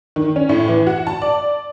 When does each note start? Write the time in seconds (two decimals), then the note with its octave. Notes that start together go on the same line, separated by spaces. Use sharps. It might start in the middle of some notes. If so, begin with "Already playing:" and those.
0.16 D#3
0.36 C#4
0.49 A2
0.68 E3
0.87 F#4
1.07 A5
1.22 D5